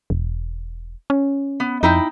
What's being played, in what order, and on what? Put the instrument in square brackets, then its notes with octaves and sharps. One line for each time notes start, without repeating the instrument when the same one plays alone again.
[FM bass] E1
C#4
[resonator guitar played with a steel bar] B3
[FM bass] F2 [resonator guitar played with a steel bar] D#4 E4 G5